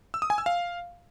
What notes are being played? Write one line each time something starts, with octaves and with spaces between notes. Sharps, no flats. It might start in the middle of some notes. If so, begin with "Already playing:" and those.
E6
D#6
G#5
E6
F5